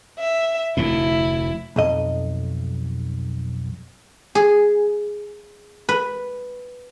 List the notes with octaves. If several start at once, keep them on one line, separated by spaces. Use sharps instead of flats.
E5
F1 D2 A2 E4
B1 F2 D#5
G#4
B4